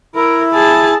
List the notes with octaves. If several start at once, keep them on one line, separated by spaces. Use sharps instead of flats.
E4 A#4
G#4 A5